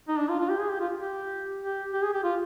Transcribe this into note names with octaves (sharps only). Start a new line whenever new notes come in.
D#4
D4
F4
F4
G4
G#4
G4
F4
G4
G4
G4
G#4
G4
F4